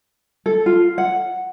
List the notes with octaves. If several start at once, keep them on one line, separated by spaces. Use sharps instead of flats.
A4
F4
F#5